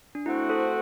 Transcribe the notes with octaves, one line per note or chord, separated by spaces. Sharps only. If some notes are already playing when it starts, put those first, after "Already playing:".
D4
A3 C4 E4 F#4
A4 C5